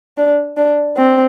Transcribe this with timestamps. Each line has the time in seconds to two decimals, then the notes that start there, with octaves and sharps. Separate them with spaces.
0.17 D4
0.57 D4
0.97 C4